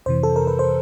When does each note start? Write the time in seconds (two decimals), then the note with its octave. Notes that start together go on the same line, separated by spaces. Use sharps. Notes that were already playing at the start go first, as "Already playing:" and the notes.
0.06 F2 C3 E3 C5
0.23 A4
0.36 A#4
0.47 B4
0.59 C5